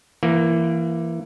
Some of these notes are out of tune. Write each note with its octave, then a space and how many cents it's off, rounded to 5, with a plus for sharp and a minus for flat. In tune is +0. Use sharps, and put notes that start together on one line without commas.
E3 +20 A#3 +0